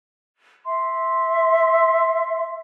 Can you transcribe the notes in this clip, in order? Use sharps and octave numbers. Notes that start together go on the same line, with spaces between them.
E5 C6